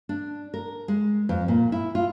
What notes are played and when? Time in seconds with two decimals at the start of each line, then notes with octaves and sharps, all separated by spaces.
0.09 D4
0.54 A#4
0.88 G#3
1.29 F2
1.48 A#2
1.72 E4
1.95 F4